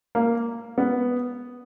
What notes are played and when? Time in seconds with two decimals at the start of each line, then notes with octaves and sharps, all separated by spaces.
0.15 A#3
0.78 B3